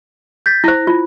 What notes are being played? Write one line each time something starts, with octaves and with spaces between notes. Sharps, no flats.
G6 A6 B6
E4 C5 A#6
F4